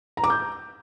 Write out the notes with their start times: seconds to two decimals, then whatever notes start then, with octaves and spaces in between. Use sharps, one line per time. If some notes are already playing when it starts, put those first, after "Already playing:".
0.17 A#5
0.24 D6
0.30 G6